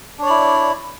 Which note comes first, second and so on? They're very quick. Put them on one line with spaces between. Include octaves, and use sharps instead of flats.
D4 C#5 D5 E4